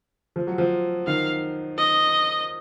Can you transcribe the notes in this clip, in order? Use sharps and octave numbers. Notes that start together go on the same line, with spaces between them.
F3
F#3
F3
D#3 F5
D#5